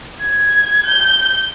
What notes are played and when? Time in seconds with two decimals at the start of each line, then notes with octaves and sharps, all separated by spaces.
0.21 G#6
0.86 G6